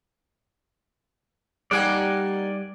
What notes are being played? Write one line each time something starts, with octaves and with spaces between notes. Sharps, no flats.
G3 A#3 D#4 G4 D5 F#5 G#5